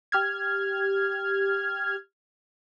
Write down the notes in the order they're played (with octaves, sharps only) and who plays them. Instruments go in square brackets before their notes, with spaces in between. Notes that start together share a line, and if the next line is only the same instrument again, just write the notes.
[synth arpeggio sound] G4 F6 G#6